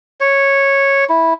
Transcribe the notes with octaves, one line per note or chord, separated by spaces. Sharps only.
C#5
E4